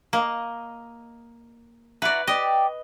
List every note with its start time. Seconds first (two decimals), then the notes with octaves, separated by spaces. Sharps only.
0.13 A#3 D#5
2.02 E4 F#4 B4 D5 A#5
2.27 G4 D5 D#5